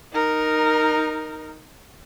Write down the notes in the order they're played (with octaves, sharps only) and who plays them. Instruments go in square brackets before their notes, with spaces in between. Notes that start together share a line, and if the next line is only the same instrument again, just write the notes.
[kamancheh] D#4 A#4